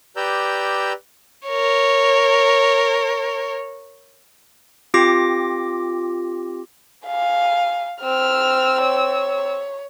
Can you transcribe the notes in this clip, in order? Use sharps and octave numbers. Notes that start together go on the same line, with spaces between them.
G4 B4 D5 A#5 E6 G6
A#4 C#5
C4 F4 G4 D6 A#6
F5 G#5
C4 E6 F6
C#5